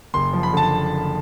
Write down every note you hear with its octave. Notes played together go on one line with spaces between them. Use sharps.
F#1 C6
F3
B5
D3 A5